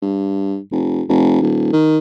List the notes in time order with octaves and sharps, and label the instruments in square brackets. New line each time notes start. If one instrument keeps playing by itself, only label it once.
[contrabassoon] G2
F1
F1
D#1
D#3